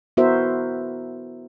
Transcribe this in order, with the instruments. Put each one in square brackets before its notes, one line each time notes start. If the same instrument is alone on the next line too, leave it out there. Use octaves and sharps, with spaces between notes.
[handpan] B3 E4 F#4 A#4 C5 E5